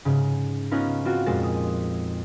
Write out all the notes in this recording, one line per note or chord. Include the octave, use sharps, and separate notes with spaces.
G#2 C#3
B3 C#4 D#4 F4 B4
B3 C4 F4 F#4
F2 A#2 G#3 C5 A6
D#6